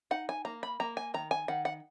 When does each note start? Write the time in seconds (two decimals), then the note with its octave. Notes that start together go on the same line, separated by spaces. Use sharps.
0.11 D#4 F#5
0.29 G#5
0.45 A#3 A#5
0.63 B5
0.80 A#3 A#5
0.97 G#5
1.14 D#3 A#5
1.31 G#5
1.48 D#3 F#5
1.65 F#5